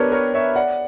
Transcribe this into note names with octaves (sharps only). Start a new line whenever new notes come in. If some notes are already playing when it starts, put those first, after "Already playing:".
Already playing: B3 D4 G4 A#4 B4 C#5
A#4 C#5
C#5 E5
D5 F#5